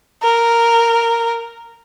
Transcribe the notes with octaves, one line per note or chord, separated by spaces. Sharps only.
A#4